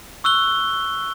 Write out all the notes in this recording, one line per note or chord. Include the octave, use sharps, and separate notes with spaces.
C#6 E6 F#6 G7